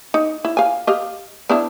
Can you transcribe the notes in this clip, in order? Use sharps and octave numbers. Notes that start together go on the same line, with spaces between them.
D#4
E4
F5 G#5
G4 D#5 F5
B3 D4 E4